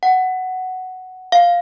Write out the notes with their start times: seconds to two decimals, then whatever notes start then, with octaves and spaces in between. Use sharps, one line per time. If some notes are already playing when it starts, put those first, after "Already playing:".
0.03 F#5
1.32 F5